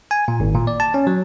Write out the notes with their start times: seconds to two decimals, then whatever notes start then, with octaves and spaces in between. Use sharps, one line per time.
0.11 G#5
0.28 A#2
0.40 G#1
0.55 A#2
0.67 D5
0.80 A5
0.94 C#4
1.07 F#3